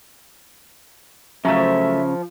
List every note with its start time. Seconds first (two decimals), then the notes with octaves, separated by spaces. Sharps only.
1.45 C#3 F3 F#3 A3 E5